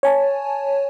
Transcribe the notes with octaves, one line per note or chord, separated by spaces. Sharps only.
C#5 G#5 A5